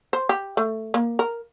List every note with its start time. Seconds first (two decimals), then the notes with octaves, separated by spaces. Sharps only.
0.13 C5
0.29 G4
0.57 A3
0.94 A#3
1.19 A#4